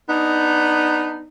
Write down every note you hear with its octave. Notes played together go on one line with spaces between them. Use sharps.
B3 D4 D#4